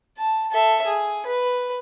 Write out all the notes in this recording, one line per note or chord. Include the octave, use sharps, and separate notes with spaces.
A5
A4 E5
G#4
B4